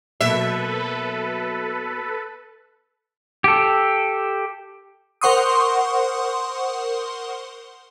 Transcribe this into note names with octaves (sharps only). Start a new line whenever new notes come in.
B2 F#3 A#3 A4 B4 E5
G4 A4
A#4 C5 F#5 C6 C#6 D#6